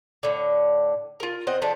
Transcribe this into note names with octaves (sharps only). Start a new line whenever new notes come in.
A2 D3
F4 A#4
C4 C5 D#5 F#5
D3 F3 A3 D4